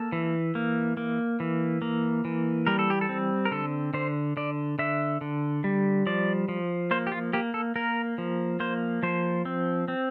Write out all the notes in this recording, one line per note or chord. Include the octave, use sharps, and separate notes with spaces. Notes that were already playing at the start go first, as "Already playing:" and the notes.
Already playing: A#3 A4
E3
A#3
A#3
E3
A#3
E3
G3 A#4
A4
G4
A4
C4
A#4
D3 A4
D3 C5
D3 D5
D3 E5
D3
G3
F3 D5
F3
A#3 C5
G4
F4
A#3 G4
A4
A#3 A#4
F3
A#3 C5
F3 C5
C4
C4